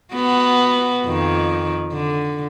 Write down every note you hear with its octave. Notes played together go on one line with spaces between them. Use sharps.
B3 F#4
F2 D#3
D3